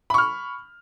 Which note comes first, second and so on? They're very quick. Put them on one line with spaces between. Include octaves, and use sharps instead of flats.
B5 C#6 F6